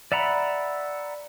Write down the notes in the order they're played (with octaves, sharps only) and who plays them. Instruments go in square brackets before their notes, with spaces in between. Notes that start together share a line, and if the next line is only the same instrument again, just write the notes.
[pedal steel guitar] D5 E5 F#5 A#5 B5